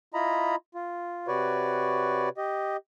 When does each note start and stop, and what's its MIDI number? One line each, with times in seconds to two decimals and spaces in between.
0.14 0.56 64
0.14 0.56 65
0.14 0.56 75
0.14 0.56 82
0.14 0.56 83
0.75 1.27 65
1.28 2.29 48
1.28 2.29 66
1.28 2.29 71
1.28 2.29 73
1.28 2.29 74
2.37 2.77 67
2.37 2.77 75